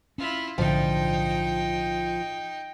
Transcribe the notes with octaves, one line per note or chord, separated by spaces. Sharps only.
C#4 E4 F4
B1 A2 D3 F3 D#4 G5